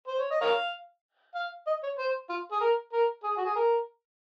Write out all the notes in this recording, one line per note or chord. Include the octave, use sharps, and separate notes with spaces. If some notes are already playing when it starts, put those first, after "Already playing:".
C5
C#5
D#5
A#4 C#5 F5
F5
D#5
C#5
C5
F4
G#4
A#4
A#4
G#4
F#4
G#4
A#4